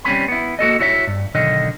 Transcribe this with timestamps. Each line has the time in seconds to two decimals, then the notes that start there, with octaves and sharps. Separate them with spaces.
0.04 G3 C4 C#4 G#5 B5
0.28 B3 E4
0.59 A#3 F#4 A4 D#5
0.80 E4 F#4 C#5 D#5 E5
1.07 G2
1.35 B1 D3 D#3 D#5